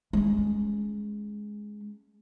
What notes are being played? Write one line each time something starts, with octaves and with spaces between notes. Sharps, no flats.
G#3 C#4